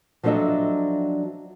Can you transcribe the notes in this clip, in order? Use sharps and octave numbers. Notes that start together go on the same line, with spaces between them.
F3 F#3 D4 A4 D#5 E5